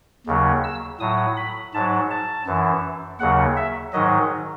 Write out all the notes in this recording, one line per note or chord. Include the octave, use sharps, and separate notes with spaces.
D#2 C#3 F#3
E6
A2 F#3 D#6
B5
G#2 F#3 A5
A5
F#2 E3
D#2 C#3 F#3 F#5
E5
G#2 D#3 F#3 D#5